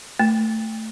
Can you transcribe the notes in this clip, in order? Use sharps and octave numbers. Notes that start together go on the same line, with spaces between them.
A3